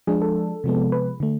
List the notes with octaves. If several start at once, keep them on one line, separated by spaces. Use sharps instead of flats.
F3 G#3 D4 G#4
A4
C3 F3 G#3 B3
B4
D3 A3